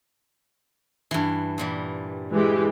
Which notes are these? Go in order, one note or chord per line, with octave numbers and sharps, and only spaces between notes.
G2 E3
A#2 E3 G3
E3 G#3 G4